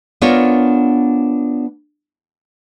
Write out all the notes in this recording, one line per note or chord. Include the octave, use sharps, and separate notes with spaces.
B3 D4 F4 A#4 C#5